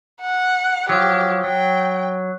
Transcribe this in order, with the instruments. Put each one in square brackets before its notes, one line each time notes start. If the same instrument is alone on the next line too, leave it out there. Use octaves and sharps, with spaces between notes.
[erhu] F#5
[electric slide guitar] F3 F#3 [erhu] G4
[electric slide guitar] F#3 [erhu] G5